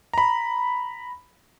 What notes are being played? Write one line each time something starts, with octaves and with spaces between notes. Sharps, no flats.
A#5 B5